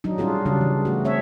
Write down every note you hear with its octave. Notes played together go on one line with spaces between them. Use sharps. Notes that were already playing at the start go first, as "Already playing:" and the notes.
F#3 D4 D#4
G3 C#4 D4 F4 G#4
C#3 G3 D4
E3
A3 F#4
C4 C#5 E5